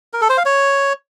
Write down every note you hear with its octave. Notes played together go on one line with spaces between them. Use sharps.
A#4
A4
C5
F5
C#5